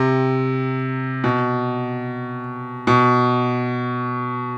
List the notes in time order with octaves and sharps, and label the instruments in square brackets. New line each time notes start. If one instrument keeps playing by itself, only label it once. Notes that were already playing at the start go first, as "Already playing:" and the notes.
Already playing: [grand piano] C3
B2
B2